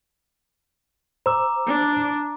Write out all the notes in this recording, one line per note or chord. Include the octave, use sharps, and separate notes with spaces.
C5 A#5 D6 E6
D4